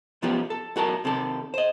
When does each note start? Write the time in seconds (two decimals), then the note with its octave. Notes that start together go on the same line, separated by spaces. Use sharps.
0.22 B1 F3 B3 C#4 F4 G4
0.50 A4
0.76 B1 F#4 A#4 A5
1.05 C3 D#3 A4
1.54 C5 D#5